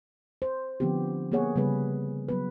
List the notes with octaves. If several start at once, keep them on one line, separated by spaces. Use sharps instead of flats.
C5
D3 F3 B3 C4 G4
A#3 B3 G#4 C#5 F#5
C#3 G3 B3 G#4 B4
F#3 B3 B4